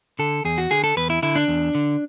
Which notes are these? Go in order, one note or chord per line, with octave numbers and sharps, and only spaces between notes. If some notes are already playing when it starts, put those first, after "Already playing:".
D3 A4
E2 G#4
F#4
D3 G#4
A4
E2 B4
E4
D3 E4
D4
E2
D3